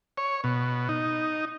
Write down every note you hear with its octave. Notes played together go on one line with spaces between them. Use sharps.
C#5
B2
D#4